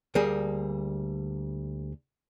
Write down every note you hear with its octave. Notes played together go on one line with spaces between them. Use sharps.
D2 G3 A#3 G#4